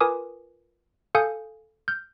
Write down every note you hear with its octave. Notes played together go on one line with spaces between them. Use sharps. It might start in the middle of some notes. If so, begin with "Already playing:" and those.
F4 A#4 B4 G#5 D6 D#6
A4 F5 G#5 D#6 G6 C#7
F6 G6